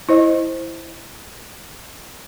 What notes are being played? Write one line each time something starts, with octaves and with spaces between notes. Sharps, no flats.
E4 C5 D#5